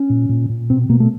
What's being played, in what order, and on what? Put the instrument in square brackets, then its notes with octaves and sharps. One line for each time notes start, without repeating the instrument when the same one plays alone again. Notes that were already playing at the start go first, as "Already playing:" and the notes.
Already playing: [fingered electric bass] C#4
A#2
A#2
A#2
B2 C4
B2 A#3
A3